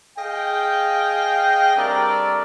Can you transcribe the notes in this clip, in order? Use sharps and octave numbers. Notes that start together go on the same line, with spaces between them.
G#4 D#5 F5 G5
G3 A3 C4 D4 A#4 D5